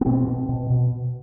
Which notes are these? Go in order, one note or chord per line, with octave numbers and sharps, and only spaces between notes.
B3
B2 C4
B2
B2
B2